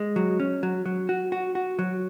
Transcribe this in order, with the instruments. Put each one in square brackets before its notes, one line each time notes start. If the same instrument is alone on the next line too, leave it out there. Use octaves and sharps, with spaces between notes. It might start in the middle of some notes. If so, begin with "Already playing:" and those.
Already playing: [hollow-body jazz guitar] G#3
F#3
C#4
F#3
F#3
F#4
F#4
F#4
F#3